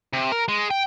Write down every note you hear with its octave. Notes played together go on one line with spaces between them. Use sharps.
C3
A#4
G#3
G5